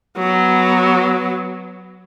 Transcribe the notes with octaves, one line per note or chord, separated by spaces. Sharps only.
F#3 B3